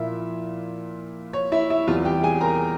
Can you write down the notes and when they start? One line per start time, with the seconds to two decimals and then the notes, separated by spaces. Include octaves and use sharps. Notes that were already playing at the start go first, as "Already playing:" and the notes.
Already playing: A#2 F3 A#3 E4 F4 E5
1.33 C#5
1.52 E4 E5
1.70 E4 E5
1.87 E2 C3 E3 G3 F4 F5
2.05 G4 G5
2.23 G#4 G#5
2.41 A#4 A#5